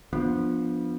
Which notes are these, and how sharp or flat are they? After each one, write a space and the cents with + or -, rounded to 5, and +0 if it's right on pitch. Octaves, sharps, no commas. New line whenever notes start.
F3 +0 B3 -20 D4 +0